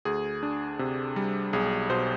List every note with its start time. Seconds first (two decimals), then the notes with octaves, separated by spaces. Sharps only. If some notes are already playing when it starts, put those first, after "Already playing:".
0.05 D2 G#4
0.43 D4
0.79 C3
1.16 G3
1.53 B1 G#4
1.90 B2 C5